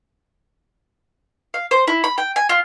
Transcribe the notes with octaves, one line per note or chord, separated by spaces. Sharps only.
F5
C5
E4
B5
G5
G#5
F4